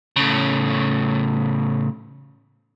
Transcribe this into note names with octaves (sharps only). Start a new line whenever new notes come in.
A2 C#3